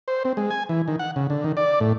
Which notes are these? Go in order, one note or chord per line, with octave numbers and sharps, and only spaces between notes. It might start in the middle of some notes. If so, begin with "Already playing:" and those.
C5
C4
G#3
G#5
E3
D#3
F#5
C#3
D3
D#3
D5
A2